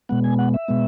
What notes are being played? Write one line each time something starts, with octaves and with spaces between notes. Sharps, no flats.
B2 G#3 B3 F#5
G#5
F#5
E5
B2 G#3 B3